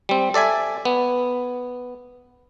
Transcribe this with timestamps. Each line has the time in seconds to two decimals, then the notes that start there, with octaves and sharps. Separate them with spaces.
0.09 G3 C4
0.34 A4 D5 E5 G#5
0.85 B3